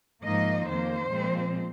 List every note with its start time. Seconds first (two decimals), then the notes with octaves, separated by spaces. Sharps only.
0.23 G#2 F3 A#3 D#4 D#5
0.67 F2 D#3 A#3 C5
1.11 A#2 F3 G#3 C4